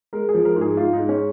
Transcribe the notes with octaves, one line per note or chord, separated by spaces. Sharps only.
G#3 A#4
G#4
F3
A#4
G#2
G#4
G#2 F4
D#4
G#3
C#4